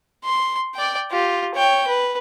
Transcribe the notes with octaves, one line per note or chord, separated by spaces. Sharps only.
C6
D5 G5
F4 G4
C#5 G5
B4